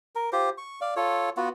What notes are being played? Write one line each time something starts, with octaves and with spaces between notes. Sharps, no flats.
A#4
F4 G4 C5
C#6
D5 F5
F4 A4 C#5
B3 F4 F#4